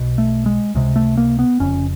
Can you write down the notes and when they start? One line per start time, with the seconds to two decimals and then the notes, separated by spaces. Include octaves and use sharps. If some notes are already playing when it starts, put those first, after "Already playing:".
Already playing: B1 B2
0.18 A3
0.46 G#3
0.75 C#2 C3 G#3
0.96 A3
1.17 A#3
1.39 B3
1.60 F1 F2 C#3 C#4